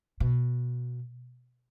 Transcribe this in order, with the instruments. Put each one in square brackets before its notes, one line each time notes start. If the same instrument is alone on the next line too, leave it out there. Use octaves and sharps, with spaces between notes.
[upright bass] B2